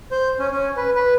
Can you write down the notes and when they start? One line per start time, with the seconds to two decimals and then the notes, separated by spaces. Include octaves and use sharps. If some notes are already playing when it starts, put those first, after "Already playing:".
0.11 C5
0.39 C#4
0.51 C#4
0.77 B4
0.95 B4